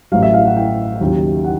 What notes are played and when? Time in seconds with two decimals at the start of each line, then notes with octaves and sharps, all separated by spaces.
0.12 A1 A2 F#3 F5
0.23 E5
0.34 F5
0.45 F#5
0.56 G5
1.01 D#2 C#3 F#3
1.44 F#5